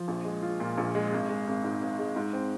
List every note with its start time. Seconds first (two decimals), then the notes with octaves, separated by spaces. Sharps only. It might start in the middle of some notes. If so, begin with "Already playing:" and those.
Already playing: F3
0.08 A#1
0.25 G#3
0.43 F4
0.60 A#2
0.78 A#1
0.95 G#3
1.12 G#1
1.29 G#3
1.47 G#1
1.64 G#2
1.81 G#1
1.99 G#3
2.16 G#2
2.33 C4